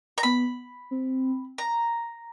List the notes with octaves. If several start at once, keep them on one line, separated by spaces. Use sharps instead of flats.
A#5
B3 B5
C4
A#5